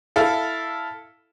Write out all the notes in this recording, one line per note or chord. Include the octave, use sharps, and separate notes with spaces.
E4 A4 F5